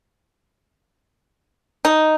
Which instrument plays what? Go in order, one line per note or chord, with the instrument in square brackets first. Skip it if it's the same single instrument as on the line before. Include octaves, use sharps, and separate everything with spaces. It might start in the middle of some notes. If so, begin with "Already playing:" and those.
[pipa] D#4